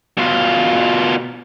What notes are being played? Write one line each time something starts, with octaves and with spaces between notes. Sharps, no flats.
B2 F4